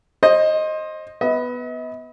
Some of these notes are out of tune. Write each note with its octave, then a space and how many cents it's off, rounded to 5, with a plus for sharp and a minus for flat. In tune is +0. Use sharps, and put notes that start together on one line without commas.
C5 +25 D#5 +0
B3 +0 D#5 +45